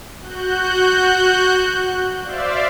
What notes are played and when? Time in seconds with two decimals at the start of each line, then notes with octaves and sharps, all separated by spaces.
0.21 F#4 F#6 G6
2.22 C5 D5 E5 F5